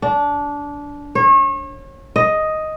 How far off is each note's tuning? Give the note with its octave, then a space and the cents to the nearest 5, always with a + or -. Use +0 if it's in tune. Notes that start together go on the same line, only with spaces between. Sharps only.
D4 -20
C#5 -35
D#5 +5